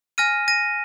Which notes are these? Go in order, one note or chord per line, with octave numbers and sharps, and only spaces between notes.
G#5 F6 A#6 D#7
A#6 D#7